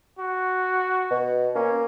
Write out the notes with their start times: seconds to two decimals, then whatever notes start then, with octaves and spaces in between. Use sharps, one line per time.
0.19 F#4
1.11 B2
1.55 A#3 C#4